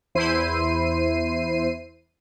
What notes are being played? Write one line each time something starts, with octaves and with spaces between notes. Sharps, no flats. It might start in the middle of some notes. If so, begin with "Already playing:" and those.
E2 E4 C5 C7 D#7